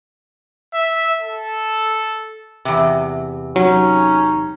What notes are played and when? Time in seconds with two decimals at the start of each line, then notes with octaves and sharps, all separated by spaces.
0.74 E5
1.21 A4
2.65 E2 C3
3.56 F#3 C#4 D#4